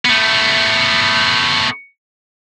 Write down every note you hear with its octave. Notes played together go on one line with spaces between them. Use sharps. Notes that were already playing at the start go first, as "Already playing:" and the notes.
A3 B3